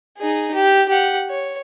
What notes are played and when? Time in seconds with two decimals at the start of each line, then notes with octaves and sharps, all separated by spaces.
0.18 D#4 G#4
0.54 G4
0.88 G4 F#5
1.30 C#5